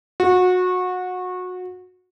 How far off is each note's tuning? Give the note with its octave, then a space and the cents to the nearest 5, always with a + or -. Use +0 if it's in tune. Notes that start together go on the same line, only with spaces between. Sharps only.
F#4 -25